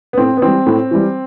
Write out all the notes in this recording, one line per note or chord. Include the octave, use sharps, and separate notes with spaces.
B3
A2 C4
B3
E3 G3 C4
A2
E3 G3